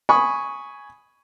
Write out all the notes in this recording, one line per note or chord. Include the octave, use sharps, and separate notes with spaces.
G#5 B5 C#6 D#6